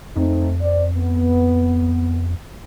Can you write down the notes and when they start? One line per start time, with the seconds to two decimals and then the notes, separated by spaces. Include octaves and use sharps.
0.16 F2 A3 C4 D#4
0.62 C4 D5
0.97 B3